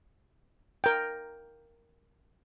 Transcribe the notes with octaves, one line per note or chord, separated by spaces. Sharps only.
A#4 G5